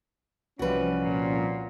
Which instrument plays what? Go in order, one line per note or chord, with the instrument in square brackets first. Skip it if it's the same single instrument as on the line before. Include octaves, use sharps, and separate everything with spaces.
[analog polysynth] C2 F3 [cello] E3 G3 [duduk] C#4 [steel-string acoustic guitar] F#4 B4
[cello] A#2